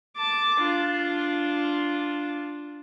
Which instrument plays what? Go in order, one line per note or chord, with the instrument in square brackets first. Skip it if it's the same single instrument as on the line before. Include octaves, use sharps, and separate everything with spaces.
[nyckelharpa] A5 D6
D4 F4